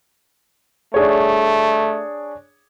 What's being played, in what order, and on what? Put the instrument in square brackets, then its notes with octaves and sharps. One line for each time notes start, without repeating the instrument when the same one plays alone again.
[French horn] A3 [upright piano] D4 G#4 C#5